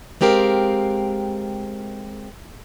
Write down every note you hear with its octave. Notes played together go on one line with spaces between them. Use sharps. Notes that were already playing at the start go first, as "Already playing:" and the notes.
G#3 C4 G4 A#4 F5